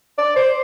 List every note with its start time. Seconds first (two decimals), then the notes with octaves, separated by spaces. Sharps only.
0.18 D5
0.36 C5